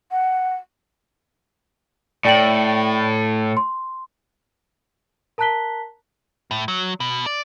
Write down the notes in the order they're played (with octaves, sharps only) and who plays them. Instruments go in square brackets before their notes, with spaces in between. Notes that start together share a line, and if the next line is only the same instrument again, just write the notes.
[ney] F#5
[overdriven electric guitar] A2 [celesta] D5 G5 F#7
[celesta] C6
A#4 A5 A#5 F#6 B6 G7
[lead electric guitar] A2
F#3
B2
D5